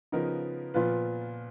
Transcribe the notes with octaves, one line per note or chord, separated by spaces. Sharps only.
C#3 F3 B3 D#4 A#4
A#2 F3 B3 F4 B4